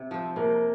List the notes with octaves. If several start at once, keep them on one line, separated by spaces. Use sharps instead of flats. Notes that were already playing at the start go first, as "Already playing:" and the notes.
Already playing: C3
F3 C4
C3 A#3